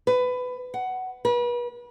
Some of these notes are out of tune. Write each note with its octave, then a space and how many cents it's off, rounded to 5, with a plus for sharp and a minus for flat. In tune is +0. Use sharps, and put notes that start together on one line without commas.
B4 +20
F#5 +15
B4 -40